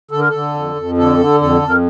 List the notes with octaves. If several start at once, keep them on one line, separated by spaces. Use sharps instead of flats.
D3 A4
A#4
D3 A4
F2
F2
D3 A4
D3
F2 A4
F2
A#4